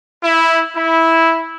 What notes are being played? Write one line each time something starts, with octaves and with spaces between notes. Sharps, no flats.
E4
E4